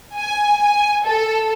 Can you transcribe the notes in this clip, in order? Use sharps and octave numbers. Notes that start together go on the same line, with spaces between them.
G#5
G#5
A4